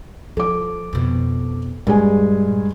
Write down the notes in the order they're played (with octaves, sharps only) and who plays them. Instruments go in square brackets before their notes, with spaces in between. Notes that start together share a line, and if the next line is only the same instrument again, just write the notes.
[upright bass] F3 [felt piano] A4 D6
[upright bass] F2 B2
[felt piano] G2 G#3 G#5 [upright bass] A#2